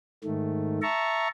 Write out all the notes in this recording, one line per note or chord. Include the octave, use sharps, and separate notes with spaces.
G#2 D#3 A3
E5 A5 A#5 C#6